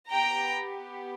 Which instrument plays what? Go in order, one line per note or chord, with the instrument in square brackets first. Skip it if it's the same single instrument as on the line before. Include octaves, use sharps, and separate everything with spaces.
[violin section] B3 G4 G5 A#5